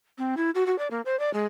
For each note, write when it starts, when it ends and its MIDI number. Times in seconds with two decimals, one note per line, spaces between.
0.18 0.35 60
0.37 0.50 64
0.55 0.66 66
0.67 0.78 66
0.79 0.88 74
0.91 1.01 58
1.05 1.18 72
1.19 1.32 74
1.34 1.46 56